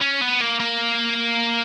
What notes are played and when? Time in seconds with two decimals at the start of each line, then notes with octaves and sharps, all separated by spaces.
0.01 C#4
0.21 B3
0.41 A#3
0.60 A#3